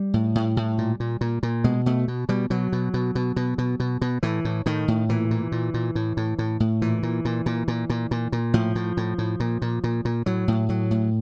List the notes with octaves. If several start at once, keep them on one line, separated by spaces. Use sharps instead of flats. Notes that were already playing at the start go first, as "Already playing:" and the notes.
Already playing: G3
A2
A2
A2
A#2
A#2
A#2
A#2
B2 G#3
B2 A3
B2
B2 G3
B2 F#3
B2
B2
B2
B2
B2
B2
B2
A2 E3
A2
A2 D#3
A2
A#2 E3
A#2
A#2
A#2
A2
A2
A2
A2
A#2 E3
A#2
A#2
A#2
A#2
A#2
A#2
A#2
A2 F3
A2
A2
A2
A#2
A#2
A#2
A#2
A2 F#3
A2
A2 F#3
A2